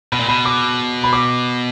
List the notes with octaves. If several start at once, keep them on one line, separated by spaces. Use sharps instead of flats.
B2 B5
A#2
B2 B5
D6
B5
D6